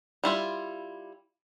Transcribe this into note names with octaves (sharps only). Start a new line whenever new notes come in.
G3 E4 F4